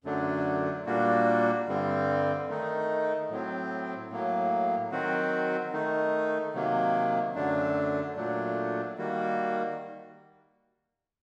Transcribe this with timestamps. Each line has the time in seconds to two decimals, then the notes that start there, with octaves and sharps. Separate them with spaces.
0.04 F#2 D3 F#3 A3 D4
0.86 A#2 G3 A#3 D4 F#4
1.67 G2 D3 G3 C4
2.48 D#3 A3 D#4
3.29 A2 F#3 C4
4.10 A2 F#3 A#3
4.91 D#3 F#3 C4 F#4
5.73 D#3 A3 D#4
6.54 C3 D#3 F#3 A#3
7.35 F#2 D3 F#3 A3 D4
8.16 A#2 F#3 A3 D4
8.97 D#3 G3 A#3 F#4